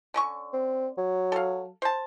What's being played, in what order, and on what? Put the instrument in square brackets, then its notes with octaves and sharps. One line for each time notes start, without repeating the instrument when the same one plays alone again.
[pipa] D3 C#4 C#6
[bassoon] C4
F#3
[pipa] A4 F5
C5 A5